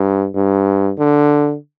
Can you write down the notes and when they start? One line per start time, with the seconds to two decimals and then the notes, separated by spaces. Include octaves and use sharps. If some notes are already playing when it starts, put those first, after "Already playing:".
Already playing: G2
0.35 G2
0.98 D3